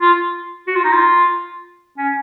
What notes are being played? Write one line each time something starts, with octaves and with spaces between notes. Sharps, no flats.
F4
F#4
F4
D#4
F4
C#4